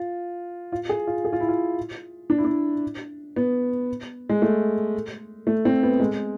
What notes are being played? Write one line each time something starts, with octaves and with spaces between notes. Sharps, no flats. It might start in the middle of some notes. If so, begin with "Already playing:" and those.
Already playing: F4
F4
G#4
F4
G#4
F4
E4
F4
D4
E4
D4
B3
G#3
A3
A3
C4
B3
G#3